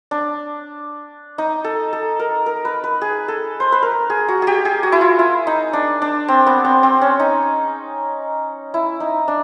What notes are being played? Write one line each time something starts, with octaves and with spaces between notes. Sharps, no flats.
D4
D#4
A4
A4
A#4
A#4
B4
B4
G#4
A4
C5
B4
A#4
G#4
F#4
G4 G#4
G#4
F#4
E4
F4
E4
D#4
D4
D4
C4
B3
C4
C4
C#4
D#4
E4
D#4
D4